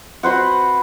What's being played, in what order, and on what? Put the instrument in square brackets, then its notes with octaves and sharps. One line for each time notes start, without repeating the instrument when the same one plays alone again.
[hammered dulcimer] F#4 B4 C5 F#5